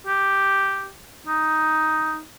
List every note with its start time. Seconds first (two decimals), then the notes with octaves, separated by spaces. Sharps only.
0.07 G4
1.27 D#4